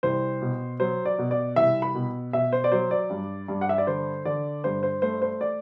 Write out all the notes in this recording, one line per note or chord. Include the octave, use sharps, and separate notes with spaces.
C2 C5
B2
F#3 C5
D5
B2
D5
C2 E5
B5
B2
B2 E5
C5
D5
F#3 C5
D5
G2
G2
F#5
E5
D5
D3 C5
D3 D5
G2 C5
C5
A3 C5
C5
D5